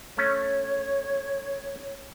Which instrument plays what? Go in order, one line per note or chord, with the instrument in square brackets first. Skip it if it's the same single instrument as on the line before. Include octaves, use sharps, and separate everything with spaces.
[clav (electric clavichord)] A3 C#4 [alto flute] C#5